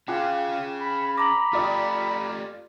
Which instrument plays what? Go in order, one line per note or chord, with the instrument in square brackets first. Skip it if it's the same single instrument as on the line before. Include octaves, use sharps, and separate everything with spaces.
[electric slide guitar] C#4 G#4 [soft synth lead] F4 [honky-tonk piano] G5 D6 F#6
[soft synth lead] B5
[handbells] A#5 D6 [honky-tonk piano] A#6 F#7
[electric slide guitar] A3 G4 [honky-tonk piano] F4 D5 D#6